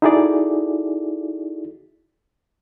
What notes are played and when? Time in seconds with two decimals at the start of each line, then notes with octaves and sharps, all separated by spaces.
0.02 D#4 E4 F#4 G#4 A4 D5